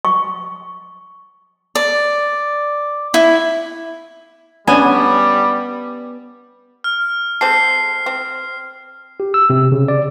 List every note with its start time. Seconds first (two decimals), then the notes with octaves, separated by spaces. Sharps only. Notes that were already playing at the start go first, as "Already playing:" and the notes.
0.05 C#6
1.75 D5
3.14 E4
4.67 G3 B3 C#4 D4 G#5
6.84 F6
7.41 G#3 C4 A4 C7
8.06 C4
9.20 G4
9.34 E6
9.50 C3
9.72 C#3
9.88 D5